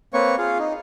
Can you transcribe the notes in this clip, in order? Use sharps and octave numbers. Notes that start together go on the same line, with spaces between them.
A#3 C4 B4 C#5 C#6
F4 G#4 F5
D#4